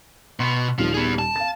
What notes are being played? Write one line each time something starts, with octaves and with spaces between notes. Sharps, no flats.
B2 B3 C6
D#1 D#3 F3 G3 F4
B3 G#4
A5
F5 A6